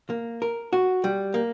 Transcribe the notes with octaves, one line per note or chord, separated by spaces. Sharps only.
A#3
A#4
F#4
G3
A#3